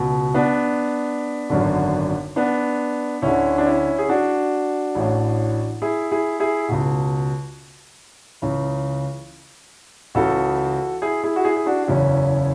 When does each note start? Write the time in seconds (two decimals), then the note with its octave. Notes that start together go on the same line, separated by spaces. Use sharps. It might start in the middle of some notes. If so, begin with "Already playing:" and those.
Already playing: C#2 B2
0.34 B3 D4
1.50 G#1 F#2 D3
2.36 B3 D4
3.22 D2 D3 C#4 E4
3.58 D4
3.66 C#4 E4
3.99 G#4
4.09 D4 F#4
4.95 A1 A2 E3
5.82 E4 G#4
6.12 E4 G#4
6.40 E4 G#4
6.68 C#2 B2
8.42 C#2 C#3 E3
10.15 C#2 C#3 E3 F#4 A4
11.02 E4 G#4
11.24 E4 G#4
11.36 F#4
11.45 E4 G#4
11.57 G#4
11.66 D4 F#4
11.84 F#4
11.88 F#1 E2 C#3 E3 C#4 E4